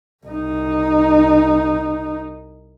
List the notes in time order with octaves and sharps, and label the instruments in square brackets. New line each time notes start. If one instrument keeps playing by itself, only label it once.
[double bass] C2 D#4